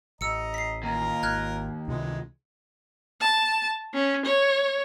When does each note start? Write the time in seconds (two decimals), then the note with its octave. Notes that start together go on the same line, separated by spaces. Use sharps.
0.21 A1 D#5 A#5 E6 C#7
0.54 B6 C7
0.83 D#2 F4 A#4 A#5
1.23 G#1 F6 F#6 G#6
1.88 C#2 C3 D#3 E3 G#3
3.21 A5
3.94 C#4
4.26 C#5